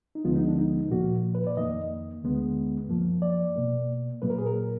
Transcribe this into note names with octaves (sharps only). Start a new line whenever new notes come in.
D#4
D2 D3 F3 G#3 B3 F4
D#4
D4
D#4
A#2 F3 A#3 F#4
B4
D5
F2 D#3 A#3 D#5
D2 D3 G#3 B3
F#2 F3 A#3
D5
B2 A#3
A#2 F#3 A#3 B4
A#4
G#4
A#4